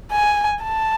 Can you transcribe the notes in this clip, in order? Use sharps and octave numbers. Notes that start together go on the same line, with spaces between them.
G#5
A5